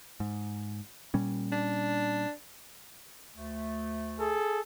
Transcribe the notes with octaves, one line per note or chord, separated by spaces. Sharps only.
G#2
A#2 G3 C#4
D4
D2 A3
G#4 A4